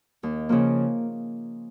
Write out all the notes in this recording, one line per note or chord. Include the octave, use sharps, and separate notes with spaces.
D#2
C#3 F3 A#3